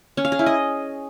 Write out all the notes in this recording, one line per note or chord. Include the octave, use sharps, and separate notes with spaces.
C#4
F5
G#4
E4
D#5